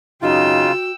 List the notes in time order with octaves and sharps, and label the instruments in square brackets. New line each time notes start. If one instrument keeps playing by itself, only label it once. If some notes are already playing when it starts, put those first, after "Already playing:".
[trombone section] G#1 F#2 D#4 [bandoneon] C#3 F4 [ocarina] F#4 [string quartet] G5 E6